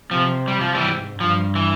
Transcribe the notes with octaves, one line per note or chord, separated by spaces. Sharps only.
C3 F3
G3
F3
E3 G3
G#2
G2 F3
E3